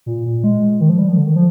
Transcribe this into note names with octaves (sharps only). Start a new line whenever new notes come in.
A#2
A#2
G#3
D#3
F3
G3
F3
D3
D#3
F3